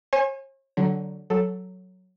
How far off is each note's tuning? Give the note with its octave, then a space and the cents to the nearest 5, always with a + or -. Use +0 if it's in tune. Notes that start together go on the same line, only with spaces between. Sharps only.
C#5 -45 G#5 -5
D3 +0 F#3 +15
F#3 +0 A4 +0